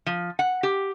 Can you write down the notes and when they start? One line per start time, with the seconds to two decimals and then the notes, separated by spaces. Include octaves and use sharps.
0.06 F3
0.39 F#5
0.63 G4